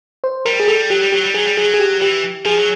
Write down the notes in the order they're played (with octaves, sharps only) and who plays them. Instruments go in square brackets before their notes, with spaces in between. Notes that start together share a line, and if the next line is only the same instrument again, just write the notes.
[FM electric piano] C5
[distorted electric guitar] G3 [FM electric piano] A#4
[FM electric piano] G#4
[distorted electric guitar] G3 [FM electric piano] A4
[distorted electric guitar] F#3 [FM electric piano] G4
[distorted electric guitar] G3
[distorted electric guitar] F#3 [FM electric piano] G4
[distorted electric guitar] G3
[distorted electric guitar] F#3 [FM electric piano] G#4
[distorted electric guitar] G3
[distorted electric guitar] F#3 [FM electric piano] G#4
[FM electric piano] G#4
G4
[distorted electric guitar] E3 [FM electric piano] G4
[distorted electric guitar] F3 [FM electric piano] G#4
[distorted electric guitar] F#3